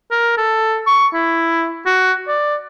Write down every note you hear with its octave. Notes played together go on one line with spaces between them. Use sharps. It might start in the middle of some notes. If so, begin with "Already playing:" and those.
A#4
A4
C#6
E4
F#4
D5